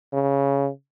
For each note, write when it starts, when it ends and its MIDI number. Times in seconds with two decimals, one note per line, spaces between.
0.13 0.69 49